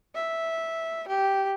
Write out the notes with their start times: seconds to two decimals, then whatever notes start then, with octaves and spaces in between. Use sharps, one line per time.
0.15 E5
1.08 G4